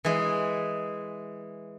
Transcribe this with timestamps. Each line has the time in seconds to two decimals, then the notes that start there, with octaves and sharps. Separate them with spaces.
0.05 E3 G#3